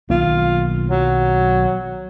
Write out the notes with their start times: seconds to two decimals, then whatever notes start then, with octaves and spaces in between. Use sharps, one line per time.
0.10 B1 D#3 A#3 F4
0.89 F#3